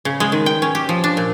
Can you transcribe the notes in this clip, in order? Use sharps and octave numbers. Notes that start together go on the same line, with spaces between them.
C#3
G#3
D#3
G5
C#4
G4
F3
D4
A#2